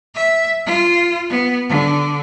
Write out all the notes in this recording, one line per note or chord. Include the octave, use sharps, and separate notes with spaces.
E5
F4
B3
D3